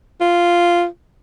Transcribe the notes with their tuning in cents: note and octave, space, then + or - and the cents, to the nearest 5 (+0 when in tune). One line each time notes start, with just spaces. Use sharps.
F4 -5